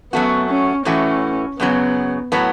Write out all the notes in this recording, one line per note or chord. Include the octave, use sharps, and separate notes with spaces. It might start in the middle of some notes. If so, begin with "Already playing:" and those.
F#2 F#3 A3 B3 F#4
C#4
A2 E3 A3 C#4 F#4
F#2 C#3 F#3 B3
A2 F#3 B3